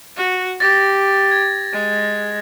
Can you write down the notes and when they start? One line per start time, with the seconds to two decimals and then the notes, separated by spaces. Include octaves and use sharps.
0.17 F#4
0.60 G4 A6 A#6
1.32 G#6
1.73 G#3